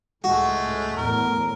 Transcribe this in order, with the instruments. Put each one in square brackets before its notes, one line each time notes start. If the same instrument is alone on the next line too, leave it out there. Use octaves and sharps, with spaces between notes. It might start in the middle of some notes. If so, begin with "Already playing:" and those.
[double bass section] C#2 A2 [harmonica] G#3 A3 [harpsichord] F#4
[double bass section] E2 A2 [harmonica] A#4